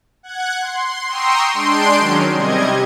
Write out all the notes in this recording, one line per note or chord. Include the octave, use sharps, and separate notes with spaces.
F#5 F#6 G#6
C6
G5 A#5 C6 C#6 D#6 E6
G#3 D4 C6 G6 D7
D#3 F#3 C#4
C3 G3 D#5 G#6